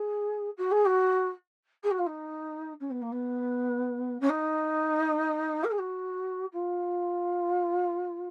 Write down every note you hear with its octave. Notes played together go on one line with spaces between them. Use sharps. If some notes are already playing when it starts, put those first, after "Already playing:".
Already playing: G#4
F#4
G#4
F#4
G#4
F#4
F4
D#4
C#4
B3
A#3
B3
C#4
D#4
A#4
G#4
F#4
F4